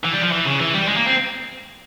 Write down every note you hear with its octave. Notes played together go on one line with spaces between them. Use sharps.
E3
G3
F3
E3
C#3
E3
G3
G#3
A#3
C4